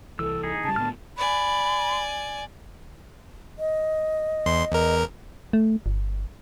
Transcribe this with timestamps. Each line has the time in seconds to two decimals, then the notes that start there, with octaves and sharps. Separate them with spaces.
0.19 C2 E3 A4 E6
0.43 D#4 G#4
0.65 C#3 G3 A5
0.76 A2 D3 B3 F6
1.18 D5 G#5 B5
3.59 D#5
4.46 E2 C6
4.72 E2 A#4
5.53 A3
5.86 G1